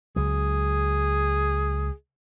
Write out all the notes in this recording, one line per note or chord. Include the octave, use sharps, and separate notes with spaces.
C#2 F#3 G#4